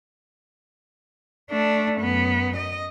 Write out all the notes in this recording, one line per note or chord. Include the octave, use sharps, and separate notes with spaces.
A3 D4
F#2 B3
D#5